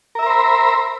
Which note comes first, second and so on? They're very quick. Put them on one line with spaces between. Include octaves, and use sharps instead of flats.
A#4 E5 A#5 C5 B5